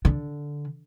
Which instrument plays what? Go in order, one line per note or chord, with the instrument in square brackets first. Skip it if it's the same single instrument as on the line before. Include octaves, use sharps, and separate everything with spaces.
[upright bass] D3